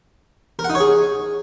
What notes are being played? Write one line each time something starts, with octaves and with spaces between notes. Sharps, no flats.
A#4
F#5
D#4
C#5
G#4